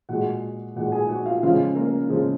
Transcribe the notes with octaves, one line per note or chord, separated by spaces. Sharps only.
A#2 G#3 F#4 F#5
A#2 G#3 F#4 F#5
G#4 G#5
F#4 F#5
F4 F5
C#3 F3 G#3 F4 F5
A#3 A#4
C#3 F3 G#3